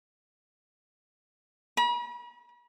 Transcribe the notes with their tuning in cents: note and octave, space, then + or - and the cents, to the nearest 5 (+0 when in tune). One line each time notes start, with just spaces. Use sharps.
B5 -45